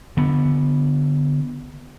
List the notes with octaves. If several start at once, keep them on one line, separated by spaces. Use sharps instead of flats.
D3 B3